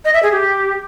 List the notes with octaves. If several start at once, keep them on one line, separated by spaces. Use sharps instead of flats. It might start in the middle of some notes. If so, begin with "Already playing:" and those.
D#5
E5
G#4
G4